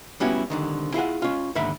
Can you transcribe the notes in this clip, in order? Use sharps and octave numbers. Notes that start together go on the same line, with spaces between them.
G3 B3 C#4 E4 F#4
C2 D3 D#3
E4 F4 G#4 F#5
C#4 F4
D#2 G#2 D3 E5 B5